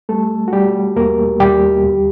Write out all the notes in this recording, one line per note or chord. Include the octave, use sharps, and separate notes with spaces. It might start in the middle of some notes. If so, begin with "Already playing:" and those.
G3 A3 A4
F#4
G3 G4
D#2 A#3 A#4
D#2 G3 G4
D2